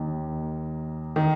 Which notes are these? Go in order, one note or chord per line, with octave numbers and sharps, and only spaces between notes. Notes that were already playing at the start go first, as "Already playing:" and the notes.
Already playing: D#2 D#3
D#3